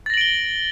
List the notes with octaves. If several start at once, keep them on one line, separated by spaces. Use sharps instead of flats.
A6 A#6 D7 F#7 G7